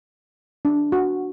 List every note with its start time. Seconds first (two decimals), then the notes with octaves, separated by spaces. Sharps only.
0.65 D4
0.92 F#4